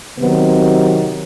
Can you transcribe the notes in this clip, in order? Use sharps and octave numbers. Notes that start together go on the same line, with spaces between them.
C3 D#3 F#3 B3